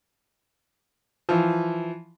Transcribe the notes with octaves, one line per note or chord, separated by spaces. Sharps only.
E3 F3